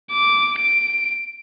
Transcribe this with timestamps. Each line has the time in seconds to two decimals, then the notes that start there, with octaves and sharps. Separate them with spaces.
0.11 D6
0.59 D7